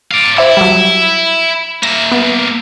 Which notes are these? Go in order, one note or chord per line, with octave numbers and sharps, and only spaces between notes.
D5 F5
E4 C5 E5 D6
F#3 G3
A#3 E5 A#6
B3